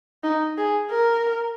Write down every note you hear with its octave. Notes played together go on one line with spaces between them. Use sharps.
D#4
G#4
A#4